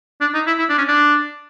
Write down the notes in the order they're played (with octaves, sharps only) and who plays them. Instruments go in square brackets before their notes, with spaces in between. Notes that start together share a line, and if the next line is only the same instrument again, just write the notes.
[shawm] D4
D#4
E4
E4
D4
C#4
D4